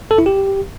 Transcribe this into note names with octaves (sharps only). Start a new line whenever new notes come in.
A4
E4
G4